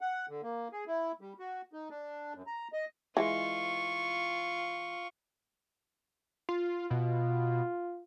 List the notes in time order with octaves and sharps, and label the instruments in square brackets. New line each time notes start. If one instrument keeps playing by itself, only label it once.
[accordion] F#5
D3
A#3
G#4
E4
G3
F#4
D#4
D4
F#2
A#5
D#5
[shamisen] E3 G3 G#3 [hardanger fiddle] F4 C#6
[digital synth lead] F4
[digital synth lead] B2 [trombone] F4